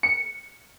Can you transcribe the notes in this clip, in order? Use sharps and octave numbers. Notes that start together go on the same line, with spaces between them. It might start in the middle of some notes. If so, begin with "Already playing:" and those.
C#7